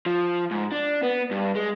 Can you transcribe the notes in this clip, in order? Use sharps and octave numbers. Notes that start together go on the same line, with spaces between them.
F3
G#2
D4
B3
G2
G#3